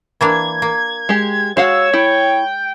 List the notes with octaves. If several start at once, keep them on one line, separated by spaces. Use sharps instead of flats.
E3 A#3 D4 G#6
A#3
G#3 G4
G#3 F#4 C#5 F5 F#5 E6
E4 G5